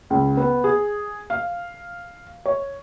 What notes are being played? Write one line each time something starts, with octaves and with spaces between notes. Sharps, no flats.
C#2
B3
G#4
F5
C#5